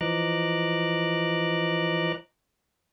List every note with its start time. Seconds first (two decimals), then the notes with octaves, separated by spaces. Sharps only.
0.01 E3 F3 D#5 A#5 D6 F#6